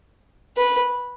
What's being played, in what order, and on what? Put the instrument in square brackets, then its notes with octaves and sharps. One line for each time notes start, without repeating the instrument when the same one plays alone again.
[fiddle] B4